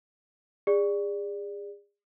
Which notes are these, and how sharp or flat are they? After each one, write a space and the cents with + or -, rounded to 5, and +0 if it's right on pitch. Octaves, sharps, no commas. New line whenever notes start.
G#4 -35 D5 +0